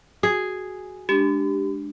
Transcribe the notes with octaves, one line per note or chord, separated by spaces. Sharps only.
F#4 G#4
G#3 D4 G4